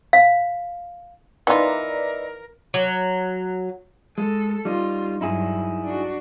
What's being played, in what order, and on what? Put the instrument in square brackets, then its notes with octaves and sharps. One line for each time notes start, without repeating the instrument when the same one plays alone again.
[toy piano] F5
[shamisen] E3 F4 [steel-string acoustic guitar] D#4 E5 [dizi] A#4 [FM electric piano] B4 D5
[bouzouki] F#3
[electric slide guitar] G#3 [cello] A4
[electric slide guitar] G3 D#4 [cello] F4
[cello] G2 F#3 [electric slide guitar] D#4 E4 G#4
[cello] D4 F#4